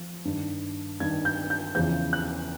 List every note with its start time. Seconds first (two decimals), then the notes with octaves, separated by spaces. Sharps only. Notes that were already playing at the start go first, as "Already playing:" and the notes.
Already playing: F3
0.25 G2 D#3
1.00 G2 D#3 G#6
1.25 G6
1.50 G6
1.75 E2 C#3 F3 G6
2.13 F#6